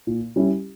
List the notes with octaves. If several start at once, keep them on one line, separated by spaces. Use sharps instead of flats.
A#2
G3 C#4 E4 G4